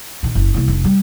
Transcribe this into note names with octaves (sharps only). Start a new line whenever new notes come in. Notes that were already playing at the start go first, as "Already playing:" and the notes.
A#2 D#3
F#1
C2 A#3
F1
G3